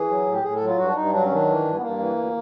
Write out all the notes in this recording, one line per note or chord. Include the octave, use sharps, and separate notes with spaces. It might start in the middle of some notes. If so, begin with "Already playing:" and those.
Already playing: E3 G#4
F#3
A2
G4
A2 G#4
A4
F#3
F4
G2 F#4
D4
G2 D#4
F#3 D4
C#4
D#3 D4
E3
G2
B3
G2 A#3
E3
D2